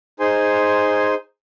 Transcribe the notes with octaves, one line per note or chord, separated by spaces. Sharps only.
D#4 G#4 C5 G#5 C6